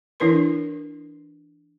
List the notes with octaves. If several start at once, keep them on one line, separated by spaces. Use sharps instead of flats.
E3 D4 E4 A#4 B4 C6